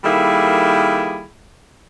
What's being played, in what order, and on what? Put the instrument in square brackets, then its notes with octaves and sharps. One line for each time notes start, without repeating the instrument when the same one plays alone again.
[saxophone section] D#3 G3 A#3 E4 G#4 A4